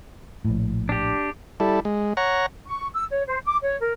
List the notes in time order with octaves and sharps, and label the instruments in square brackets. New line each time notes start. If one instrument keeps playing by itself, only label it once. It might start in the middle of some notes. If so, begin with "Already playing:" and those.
[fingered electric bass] A#1 A2
[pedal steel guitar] D4 G4
[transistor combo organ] G3 E4 A4
G#3
C#5 F#5 A#5
[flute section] C#6
E6
C#5
C5
D6
C#5
A#4